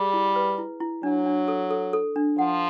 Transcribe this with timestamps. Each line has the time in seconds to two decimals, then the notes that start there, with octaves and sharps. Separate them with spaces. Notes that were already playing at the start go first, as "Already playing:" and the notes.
Already playing: G3 G#4
0.13 E4
0.36 B4
0.58 E4
0.80 E4
1.03 F#3 D4
1.26 D4
1.48 A4
1.71 A4
1.93 A4
2.16 D4
2.38 F3 F#5